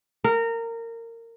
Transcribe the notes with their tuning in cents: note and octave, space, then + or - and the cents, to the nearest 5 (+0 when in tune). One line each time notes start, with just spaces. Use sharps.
A#4 -20